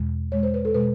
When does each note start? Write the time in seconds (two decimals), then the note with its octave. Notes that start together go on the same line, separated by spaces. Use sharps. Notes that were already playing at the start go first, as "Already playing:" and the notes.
Already playing: E2 B2 G#3
0.32 E2 B2 G#3 C#5
0.43 C5
0.54 B4
0.65 A4
0.75 B2 G#3 B4